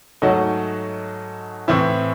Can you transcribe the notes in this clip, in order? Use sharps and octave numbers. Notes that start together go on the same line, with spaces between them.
G#2 F#3 A3 D#4 F#4
A2 E3 C4 E4